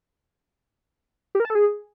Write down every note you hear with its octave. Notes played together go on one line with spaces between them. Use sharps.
G4
A#4
A5
A4
G#4